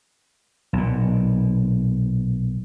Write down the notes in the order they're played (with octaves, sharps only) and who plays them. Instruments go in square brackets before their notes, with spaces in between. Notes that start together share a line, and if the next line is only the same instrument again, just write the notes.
[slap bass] B1 A#2